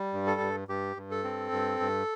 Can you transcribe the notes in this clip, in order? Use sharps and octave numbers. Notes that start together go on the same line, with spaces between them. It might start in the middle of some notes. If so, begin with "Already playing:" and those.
Already playing: G3
G2
A4
G2
G2 G4
G2
A4
C4
G2
G2